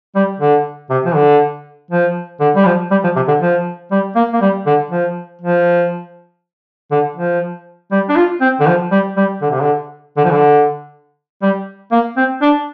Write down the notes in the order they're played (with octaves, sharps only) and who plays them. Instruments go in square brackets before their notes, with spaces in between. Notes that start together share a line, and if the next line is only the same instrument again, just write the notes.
[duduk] G3
D3
C3
F3
D3
F3
D3
G3
F3
G3
F3
C3
D3
F3
G3
A#3
A#3
G3
D3
F3
F3
D3
F3
G3
D4
F4
C4
D3
F3
G3
G3
D3
C3
D3
D3
F3
D3
G3
A#3
C4
D4